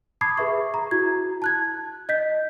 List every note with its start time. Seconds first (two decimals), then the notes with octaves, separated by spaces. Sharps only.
0.21 A5 B5 D6 D#6 G#6 C7
0.37 G#4 B4 E5 C#6
0.74 A#5
0.91 E4 F#4 G#6
1.42 A5 F#6 G#6
2.09 D#5 G6 B6